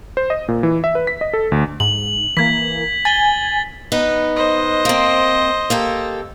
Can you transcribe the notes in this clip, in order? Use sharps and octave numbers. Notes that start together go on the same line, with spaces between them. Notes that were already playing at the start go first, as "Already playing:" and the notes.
C5
D#5
A#2
E3
E5
B4
B6
D#5
A4
D2
G#2 F#7
E3 A#3 G#6 B6
G#5 A6 G7
B3 D#4 B4
C5 D#5
A#3 C4
A#3 G4 A4